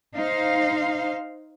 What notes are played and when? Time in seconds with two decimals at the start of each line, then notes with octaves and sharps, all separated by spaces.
0.16 D#4 C5 F5